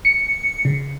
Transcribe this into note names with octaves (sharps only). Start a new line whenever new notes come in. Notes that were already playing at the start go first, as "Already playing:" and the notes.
C#7
C#3